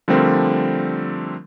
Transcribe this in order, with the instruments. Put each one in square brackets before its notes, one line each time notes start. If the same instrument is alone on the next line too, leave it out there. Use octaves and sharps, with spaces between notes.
[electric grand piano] D3 F3 G3 A3 C4 A#4